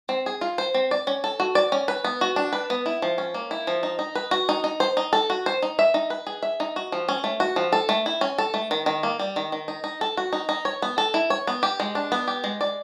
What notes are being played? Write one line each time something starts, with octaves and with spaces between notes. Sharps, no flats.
C4
G#4
F4
C5
C4
D5
C#4
A4
F#4
D5
C#4
B4
B3
F#4
D4
B4
B3
E4
F3
C#4
A#3
E4
F3
D#4
D#4
B4
F#4
D#4
D#4
C5
D#4
A4
F#4
C5
D#4
E5
D#4
B4
G#4
E5
D#4
F#4
F3
C#4
A3
F#4
F3
A4
A3
E4
C#4
A4
A3
D#3
D#3
A#3
G3
D#3
D#3
D#4
D#4
A4
F#4
D#4
D#4
C#5
B3
A4
E4
C#5
B3
G4
G#3
D4
B3
G4
G#3
D5